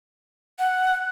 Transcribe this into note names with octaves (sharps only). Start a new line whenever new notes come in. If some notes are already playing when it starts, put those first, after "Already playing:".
F#5